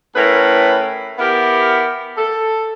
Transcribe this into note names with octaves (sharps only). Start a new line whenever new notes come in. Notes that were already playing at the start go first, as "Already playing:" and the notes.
A2 C#4 E4 A#4 B4
B3 E4 G4 A#4
A4